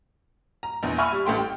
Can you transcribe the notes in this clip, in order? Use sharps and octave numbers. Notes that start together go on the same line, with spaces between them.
A#5
A#1 E2
E5 G#5 B5 C#6 F6
G3
A1 A3 G5 C6
G5